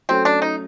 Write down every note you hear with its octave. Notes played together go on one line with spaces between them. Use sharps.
F#3 A3 C4 C#4
D4
D#4